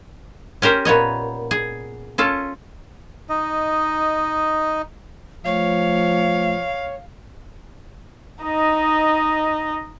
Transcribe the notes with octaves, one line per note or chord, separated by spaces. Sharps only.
C#4 G4 A#4 C5
A#2 B3 C#5 D#5
G#4
C#4 F4 A4
D#4 D#5
F3 A3 C#5 F5
D#4 D#5